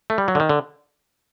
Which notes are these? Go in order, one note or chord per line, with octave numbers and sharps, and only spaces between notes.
A3
G3
F#3
D3
D#3
D3